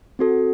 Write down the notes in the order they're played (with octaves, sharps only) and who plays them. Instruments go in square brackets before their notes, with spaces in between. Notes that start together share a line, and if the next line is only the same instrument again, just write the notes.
[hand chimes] C4 F#4 A4